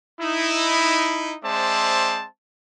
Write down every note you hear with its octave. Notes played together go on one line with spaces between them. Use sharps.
D#4 E4
G#3 C4 C5 D5 E5 A5